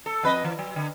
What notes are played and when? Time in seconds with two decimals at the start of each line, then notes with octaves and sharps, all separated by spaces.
0.06 A4
0.23 F2 B4 D#5
0.44 E3
0.59 F#3
0.76 D3